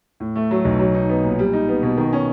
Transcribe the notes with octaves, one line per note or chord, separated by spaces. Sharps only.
A2
A3
F#3
B1
F#3
D#4
B3
A#2
G3
D#4
B3
B2
D#3
C#4